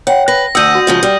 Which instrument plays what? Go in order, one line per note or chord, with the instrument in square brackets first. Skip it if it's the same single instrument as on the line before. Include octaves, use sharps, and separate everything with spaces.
[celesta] C#5 G5 [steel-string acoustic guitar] F#5
[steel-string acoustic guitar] B4 [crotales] A#6
[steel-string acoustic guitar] D2 F#5 [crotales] D#6 G6 D#7 [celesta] E6
[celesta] F#4
[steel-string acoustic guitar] G#2 C#3 F3
G3